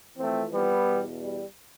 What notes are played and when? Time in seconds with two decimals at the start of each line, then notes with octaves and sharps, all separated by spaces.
0.18 F2 E3 A3 C4
0.53 G3 B3
0.87 E2 B2
1.20 G3